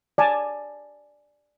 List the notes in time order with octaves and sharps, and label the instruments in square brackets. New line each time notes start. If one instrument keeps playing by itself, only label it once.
[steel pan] D5 G#5 A5